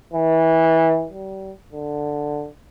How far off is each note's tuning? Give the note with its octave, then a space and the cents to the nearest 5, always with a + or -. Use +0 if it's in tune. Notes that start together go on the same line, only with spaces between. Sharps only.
E3 -20
G3 -35
D3 +5